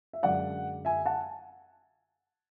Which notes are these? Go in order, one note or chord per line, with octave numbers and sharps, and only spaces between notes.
E5
F#2 D3 G#3 D5 F#5
E5 G#5
F#5 A5